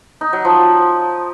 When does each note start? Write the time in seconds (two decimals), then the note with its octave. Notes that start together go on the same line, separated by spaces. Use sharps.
0.21 D#4
0.33 F#3
0.45 F3